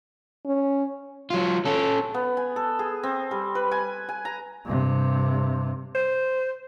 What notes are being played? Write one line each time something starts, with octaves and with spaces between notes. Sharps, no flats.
C#4
F#3 F4
C#4 A4
B3
G#5
A4
G#4
C4
G3
B4
G#5
G#5
A#5
G2 C3
C5